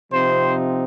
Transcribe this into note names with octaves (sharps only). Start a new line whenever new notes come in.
C3 F3 C4 D#4 C5